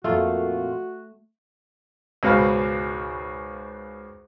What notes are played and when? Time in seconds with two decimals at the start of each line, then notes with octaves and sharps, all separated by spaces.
0.04 F2 A#2 A3 F4 F#4
2.23 C#2 G#2 B2 F5